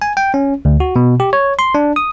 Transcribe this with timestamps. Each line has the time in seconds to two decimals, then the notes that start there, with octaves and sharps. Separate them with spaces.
0.02 G#5
0.17 G5
0.34 C#4
0.65 D2
0.80 F#4
0.96 B2
1.20 G4
1.33 C#5
1.59 C6
1.75 D4
1.96 D#6